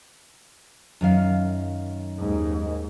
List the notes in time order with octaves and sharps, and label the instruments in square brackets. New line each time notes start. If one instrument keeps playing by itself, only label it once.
[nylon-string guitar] F#2 D#3 F5
[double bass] D#2 G#2